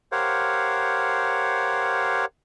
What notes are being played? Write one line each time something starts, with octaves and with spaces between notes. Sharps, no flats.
G4 A#4 C5 C#5 F5 F#5